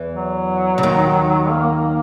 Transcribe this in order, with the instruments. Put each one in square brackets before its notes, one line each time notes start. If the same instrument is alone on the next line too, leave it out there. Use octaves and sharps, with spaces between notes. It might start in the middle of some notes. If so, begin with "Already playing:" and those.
Already playing: [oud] E2 E3
[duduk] F#3
[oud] C#3
D#2 D#3
[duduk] A#3